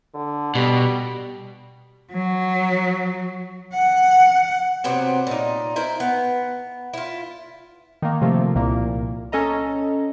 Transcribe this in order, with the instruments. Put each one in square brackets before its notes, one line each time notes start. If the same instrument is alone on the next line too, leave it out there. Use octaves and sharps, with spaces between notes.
[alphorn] D3
[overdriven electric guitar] B2 [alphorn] G3
[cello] F#3
F#5
[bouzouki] C3 F#3 B3 C4
A#2 D#4
E4 A#4 C5
B3
E4 F4
[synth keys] D#3 A#3
C3 F3 A3 A#3
C2 A#2 A#3
C#4 A4 D#5 A#5